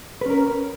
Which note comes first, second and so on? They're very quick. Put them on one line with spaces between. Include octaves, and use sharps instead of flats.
B4 C#4 A#4